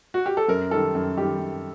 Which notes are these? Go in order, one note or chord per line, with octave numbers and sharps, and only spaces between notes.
F#4
G4
A4
F#2 A#4
D#3 G3 A4
F#2
D#3 G3 G4
F#2